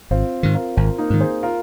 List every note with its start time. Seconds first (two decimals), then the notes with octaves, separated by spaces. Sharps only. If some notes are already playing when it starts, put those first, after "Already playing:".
0.11 G#1 C4 F4
0.43 G#2 D#3
0.54 F4 A#4
0.77 G#1 F4 A#4
0.98 A#3 D#4
1.10 G#2 D#3
1.20 G#4 C5
1.43 F4 A#4